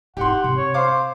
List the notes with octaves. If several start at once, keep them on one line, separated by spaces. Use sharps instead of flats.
G#2 E4 G4 F#5 C6
C3
C#5
C5 F5 D6